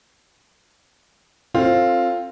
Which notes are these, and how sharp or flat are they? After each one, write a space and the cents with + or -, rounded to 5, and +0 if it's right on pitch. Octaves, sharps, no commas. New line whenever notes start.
C4 +20 F4 +0 A4 +20